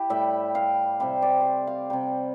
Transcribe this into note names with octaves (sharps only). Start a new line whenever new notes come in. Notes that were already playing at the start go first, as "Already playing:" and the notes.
Already playing: E4 G4
A2 G3 E5
F5
C3 G3 E5
D5
C5 D5
F5
C3 G3 G5